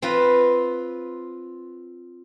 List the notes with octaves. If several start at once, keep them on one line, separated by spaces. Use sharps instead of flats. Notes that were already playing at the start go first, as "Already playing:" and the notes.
C4 F4 B4